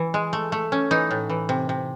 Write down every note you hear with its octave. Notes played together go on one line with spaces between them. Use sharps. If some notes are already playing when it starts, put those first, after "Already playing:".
Already playing: E3
G#3
A3
A3
C#4
E3 D#4
A2
E3
C3
C3